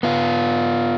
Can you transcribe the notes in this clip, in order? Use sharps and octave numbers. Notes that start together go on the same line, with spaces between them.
B3 F4